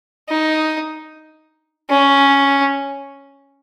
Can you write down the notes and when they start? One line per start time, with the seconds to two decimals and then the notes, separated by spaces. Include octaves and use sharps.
0.29 D#4
1.89 C#4